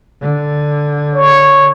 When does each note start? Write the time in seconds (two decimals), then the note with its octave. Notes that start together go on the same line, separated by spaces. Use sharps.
0.22 D3
1.15 C#5